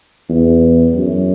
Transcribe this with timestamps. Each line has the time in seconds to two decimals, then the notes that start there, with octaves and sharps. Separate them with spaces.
0.29 E2
0.95 F#2